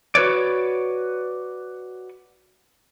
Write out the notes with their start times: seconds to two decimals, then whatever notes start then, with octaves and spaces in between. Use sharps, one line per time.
0.15 F#4 B4 C#5 D5